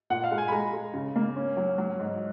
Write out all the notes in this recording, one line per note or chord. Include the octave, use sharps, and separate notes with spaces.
A#2 F#5
F5
G#3
G#5
B5
G#3 A#5
G#3
C#3
A#3
C#4
F#3
F#3
G#2